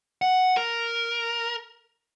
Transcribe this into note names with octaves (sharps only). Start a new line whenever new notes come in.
F#5
A#4